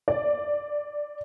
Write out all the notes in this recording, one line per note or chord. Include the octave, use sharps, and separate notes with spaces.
D5